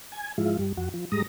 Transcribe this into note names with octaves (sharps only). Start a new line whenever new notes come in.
G#5
G#2 F3 G#3 E4 F4
G2 G3
F2 F#4
F3
G#2 G3 G#3 A#5 D#6